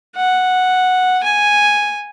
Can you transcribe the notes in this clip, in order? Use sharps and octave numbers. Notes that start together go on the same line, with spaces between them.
F#5
G#5